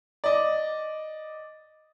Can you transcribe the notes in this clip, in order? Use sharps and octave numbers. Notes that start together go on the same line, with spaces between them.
D5 D#5